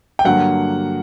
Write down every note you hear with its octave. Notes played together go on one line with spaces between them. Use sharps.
G5
G2 D3 F#3 A#3 F#5